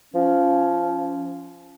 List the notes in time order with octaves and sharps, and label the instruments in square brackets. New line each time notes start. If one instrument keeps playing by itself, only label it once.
[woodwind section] F3 C#4